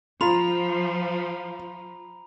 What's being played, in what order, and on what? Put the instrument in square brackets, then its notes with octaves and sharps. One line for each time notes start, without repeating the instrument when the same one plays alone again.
[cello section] F3 [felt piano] F4 [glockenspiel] A#5 B5 F7